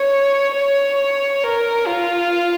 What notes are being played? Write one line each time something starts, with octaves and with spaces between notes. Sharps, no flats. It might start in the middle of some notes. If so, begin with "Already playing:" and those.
Already playing: C#5
C#5
A#4
F4